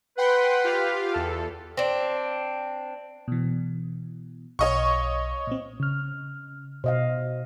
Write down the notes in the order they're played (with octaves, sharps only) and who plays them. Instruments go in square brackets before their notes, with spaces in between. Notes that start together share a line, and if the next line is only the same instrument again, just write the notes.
[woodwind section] B4 [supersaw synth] F#5 G5 C6
[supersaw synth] F4 G4 F5
E2 A4
[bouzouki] C4 D4
[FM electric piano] B2 E3
[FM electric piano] B1 F5 [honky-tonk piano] C#5 D#5 C#6
[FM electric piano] A#2 C4
C#3 F6
[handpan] B2 D#5 F5 [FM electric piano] C5